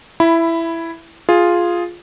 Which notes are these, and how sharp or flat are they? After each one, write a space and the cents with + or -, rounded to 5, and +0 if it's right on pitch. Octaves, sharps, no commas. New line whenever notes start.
E4 +10 B5 +0
F4 +0 G#4 +0